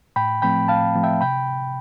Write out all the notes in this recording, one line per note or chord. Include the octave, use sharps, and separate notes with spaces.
A2 G5 B5
F3 A3 C4 G5 B5
A2 F5 A5
F3 A3 C4
E5 G5
C3 G5 B5